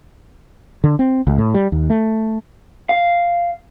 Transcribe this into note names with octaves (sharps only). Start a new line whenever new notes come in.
D3
C4
C#2
A2
G3
D#2
A3
F5